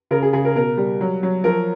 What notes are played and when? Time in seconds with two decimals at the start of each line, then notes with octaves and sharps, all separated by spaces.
0.11 C#3 A#4
0.22 G#4
0.33 C#3 G#4
0.45 A#4
0.56 B2 A#4
0.77 G3
1.01 F#3
1.23 F#3
1.44 F3 A#4